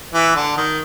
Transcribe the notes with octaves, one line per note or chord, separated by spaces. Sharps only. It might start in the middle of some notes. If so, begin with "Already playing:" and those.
E3
D3
D#3